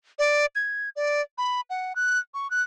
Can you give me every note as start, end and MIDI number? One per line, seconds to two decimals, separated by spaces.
0.19 0.46 74
0.55 0.89 92
0.96 1.21 74
1.38 1.61 83
1.70 1.95 78
1.95 2.19 90
2.34 2.50 85
2.51 2.62 90